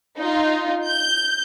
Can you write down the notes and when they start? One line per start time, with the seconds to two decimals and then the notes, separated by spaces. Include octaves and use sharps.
0.18 D#4 F4
0.87 G6